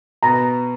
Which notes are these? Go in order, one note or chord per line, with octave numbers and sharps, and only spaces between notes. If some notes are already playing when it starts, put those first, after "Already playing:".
B2 B3 A#5